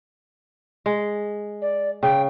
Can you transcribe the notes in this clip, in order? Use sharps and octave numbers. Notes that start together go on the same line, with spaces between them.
G#3
D5
C#3 G5